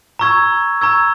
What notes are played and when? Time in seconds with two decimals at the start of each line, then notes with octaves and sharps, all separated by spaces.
0.19 A#5 C#6 E6 G#6
0.81 A#5 C#6 E6 G#6